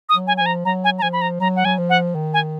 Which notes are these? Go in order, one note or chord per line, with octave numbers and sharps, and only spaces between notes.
D#6
F#3
G#5
F3 G#5
A#5
F#3 A#5
G#5
A#5
F3 G#5
B5
A#5
F#3 A#5
F#5
F#3 G#5
F3
F#5
D#3
G#5